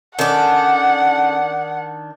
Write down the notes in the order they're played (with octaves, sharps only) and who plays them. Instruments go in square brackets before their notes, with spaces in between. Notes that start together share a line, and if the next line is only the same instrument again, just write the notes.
[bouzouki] D#3 D4 [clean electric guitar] C#4 A4 [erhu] F#5